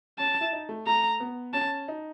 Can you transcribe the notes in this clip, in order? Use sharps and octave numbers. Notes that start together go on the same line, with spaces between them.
C#4 A5
E4
D#4
A3
A3 A#5
B3
C#4 A5
D#4